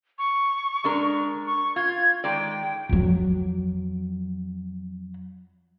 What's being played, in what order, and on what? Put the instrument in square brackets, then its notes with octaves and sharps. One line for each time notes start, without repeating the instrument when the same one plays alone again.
[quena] C#6
[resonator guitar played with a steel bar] G#3 D4 A#4
[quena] C#6
[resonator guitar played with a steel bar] F4 [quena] G#6
[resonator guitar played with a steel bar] D#3 G#3 D5 [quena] G5
[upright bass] F2 F#3